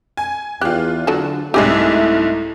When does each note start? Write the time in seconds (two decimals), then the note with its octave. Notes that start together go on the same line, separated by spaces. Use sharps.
0.17 G#5
0.61 E2 F4 G4 F#6
1.07 D3 F#3 D4 A4
1.54 C2 G#2 A3 E4 G4 G#4 D#5 E5